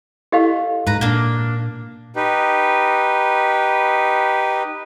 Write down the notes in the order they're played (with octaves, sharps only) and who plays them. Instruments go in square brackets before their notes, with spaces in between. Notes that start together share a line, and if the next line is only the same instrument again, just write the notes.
[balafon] E4 A4 [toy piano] G4 D#5 F5
[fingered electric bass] G#2 [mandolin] B4 A#5
[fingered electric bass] A#2 [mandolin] A#3 D4
[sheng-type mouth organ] D#4 G4 B4